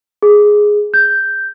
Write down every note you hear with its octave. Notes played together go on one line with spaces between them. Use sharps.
G#4
G6